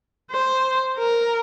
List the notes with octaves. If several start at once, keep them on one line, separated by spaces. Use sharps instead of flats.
C5
A#4